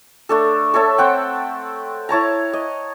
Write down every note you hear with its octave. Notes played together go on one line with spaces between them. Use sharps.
A3 D4 A4
A4 C#5 E5 A5
C4 F#5 G5
E4 C#5 A5 A#5
D#5